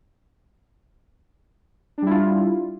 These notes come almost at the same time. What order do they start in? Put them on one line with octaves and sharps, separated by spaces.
D4 G3 E4 F4